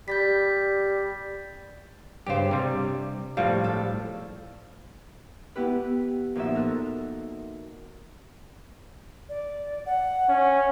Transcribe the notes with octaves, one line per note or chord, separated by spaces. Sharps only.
G3 G6 A6 B6
G2 C#3 G4 C5 F5
C3 G3 D4
A2 F3 G3 F#4 F5
A4
B3 E4 G4 B4
A#2 F3 D#4 F#4 E5
A4 A#4 F#6
D5
F#5
C#4